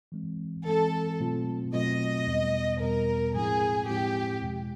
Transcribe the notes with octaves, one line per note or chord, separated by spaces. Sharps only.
E3 G#3 C4
E3 G#3 C4 A4
B2 F#3 A3 C4 F4
B2 F#3 A3 C4 F4 D#5
E2 B2 G3 B3
E2 B2 G3 B3 A#4
A2 F3 G#3 C4 E4 G#4
A2 F3 G#3 C4 E4 G4
E2 B2 G#3